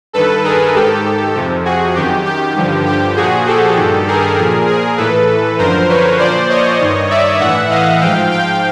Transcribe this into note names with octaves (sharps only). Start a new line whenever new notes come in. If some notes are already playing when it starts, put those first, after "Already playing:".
G2 D#3 A4 B4
G#4 A#4
G#2 D#3 G4 A4
F2 C3 F3
F#4 G#4
F#2 D#3 G4
G4
G2 D3 F3
G4
A#2 F3 F#4 G#4
G4 A4
G2 D#3
G#4 A#4
A#2 F3
G#4 A#4
A2 E3 A4 B4
F#2 D3 F3 A#4 C5
B4 C#5
A#2 F3 C5 D5
C#5 D#5
G2 D#3
D5 E5
A2 E3 E5 F#5
D#5 F5
G#2 F3 F5 G5
F5 G5